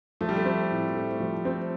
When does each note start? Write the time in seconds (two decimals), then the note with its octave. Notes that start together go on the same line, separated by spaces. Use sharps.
0.21 F3 A3
0.29 G3
0.37 A3
0.45 C4
0.71 A2
0.95 A3
1.20 F3
1.45 C4